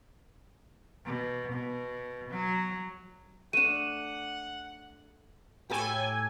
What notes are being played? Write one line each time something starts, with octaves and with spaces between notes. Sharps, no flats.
B2
B2
F#3
A3 D4 F#5 D#7 E7
A2 G4 A4 G5 G#5 B5 D6